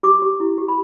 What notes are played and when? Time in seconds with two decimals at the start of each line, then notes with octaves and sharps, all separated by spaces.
0.03 G4 D6
0.22 G4
0.40 E4
0.58 G4
0.68 B5